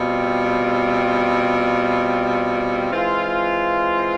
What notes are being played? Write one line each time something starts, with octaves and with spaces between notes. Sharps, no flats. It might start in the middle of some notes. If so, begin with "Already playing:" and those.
Already playing: B2 G3 C4 F4
E3 G#3 C4 F4